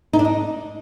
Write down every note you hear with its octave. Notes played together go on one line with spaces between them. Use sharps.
D#4
D4
D#4